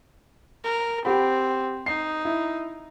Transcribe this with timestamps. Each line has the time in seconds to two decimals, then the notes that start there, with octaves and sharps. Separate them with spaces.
0.64 A#4
1.05 C4 G4 F#5 B5
1.86 D#4 C7
2.25 E4